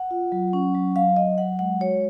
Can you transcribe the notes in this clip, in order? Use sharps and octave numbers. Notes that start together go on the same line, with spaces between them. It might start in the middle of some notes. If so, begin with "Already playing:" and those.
Already playing: F#5
F4
F#3
C#4
F#3
F#3 F5
F#3 D#5
F#3 F#5
G#3 F#5
F#4 C#5